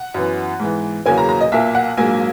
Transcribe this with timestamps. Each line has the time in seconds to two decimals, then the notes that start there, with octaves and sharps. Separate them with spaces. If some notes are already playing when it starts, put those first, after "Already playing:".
Already playing: F#5
0.14 F#2 E3 B3
0.60 G#2 E3 B3
1.06 E2 C#3 F#3 A#3 C#4 G#5
1.18 A#5
1.29 A#5
1.41 D#5
1.52 B1 A#2 A#3 E5
1.75 F#5
1.97 A#1 G#2 F#3 A#3 G#5